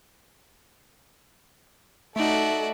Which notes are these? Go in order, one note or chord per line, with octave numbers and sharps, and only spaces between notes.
A3 D#4 F#4 A4 D5 E5